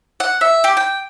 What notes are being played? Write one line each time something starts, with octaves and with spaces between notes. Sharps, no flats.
F#5
E5
G4
G5